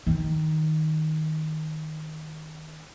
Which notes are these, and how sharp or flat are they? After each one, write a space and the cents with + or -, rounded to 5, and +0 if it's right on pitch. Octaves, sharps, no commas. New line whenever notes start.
D#3 +5